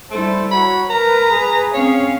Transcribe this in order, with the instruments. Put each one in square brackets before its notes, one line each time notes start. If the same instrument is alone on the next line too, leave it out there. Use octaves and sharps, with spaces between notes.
[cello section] G3 E4 A4 [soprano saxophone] A3 [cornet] C5
[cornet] F#4 [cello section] C#5 [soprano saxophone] B5
[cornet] A#4 [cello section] B4 [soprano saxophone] A#5
[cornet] G#4
[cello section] C4 C#4 F5 [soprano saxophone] C#5